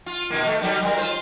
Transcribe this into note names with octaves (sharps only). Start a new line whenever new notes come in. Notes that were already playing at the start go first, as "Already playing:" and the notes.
F4
B2 D#3 A#3
A3
D#3 F#3 G3
G3 A#4
F4 C5